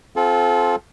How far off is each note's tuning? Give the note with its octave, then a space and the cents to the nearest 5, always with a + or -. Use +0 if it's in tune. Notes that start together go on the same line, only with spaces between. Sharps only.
C4 +0 F4 +0 A4 -30